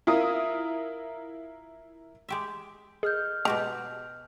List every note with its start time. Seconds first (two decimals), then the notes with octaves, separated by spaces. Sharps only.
0.07 E4 F4 A#4 D#6
2.29 G#3 G4 E5
3.03 G#4 D#5 F6 G6
3.45 B2 G#3 F#4 G4 A#5